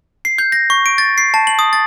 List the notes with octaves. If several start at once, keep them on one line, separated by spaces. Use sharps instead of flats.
C7
G6
A#6
C#6
D7
A6
C7
A5
F#7
D#6
A6